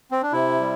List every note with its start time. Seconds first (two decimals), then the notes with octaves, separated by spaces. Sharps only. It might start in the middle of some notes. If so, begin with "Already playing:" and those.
0.11 C4
0.22 D4
0.32 C3 E4
0.60 G3